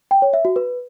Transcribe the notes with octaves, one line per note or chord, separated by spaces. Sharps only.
G5
C#5
E5
F#4
B4